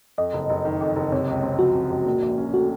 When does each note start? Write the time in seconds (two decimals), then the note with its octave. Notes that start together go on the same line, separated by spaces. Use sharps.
0.18 F2 D#5
0.33 F#1
0.50 F#1
0.65 D#3
0.81 F2
0.96 F#1
1.12 C3 C#5
1.28 C#2
1.43 C4
1.59 F3 F#4
1.75 C3
1.91 C#2
2.06 A#2
2.22 A#1
2.38 C#4
2.54 A3 F#4